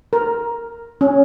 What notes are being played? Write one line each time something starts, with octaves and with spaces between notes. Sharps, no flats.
A#4
C#4